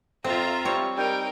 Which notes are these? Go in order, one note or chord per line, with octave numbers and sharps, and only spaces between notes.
F2 C4 F4 E5 A#5
G3 C4 C#5
G3 D#4 A#4 G5